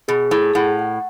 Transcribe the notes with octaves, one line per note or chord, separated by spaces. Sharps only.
B2 G#4
A2 G#4
A2 F#5
F#5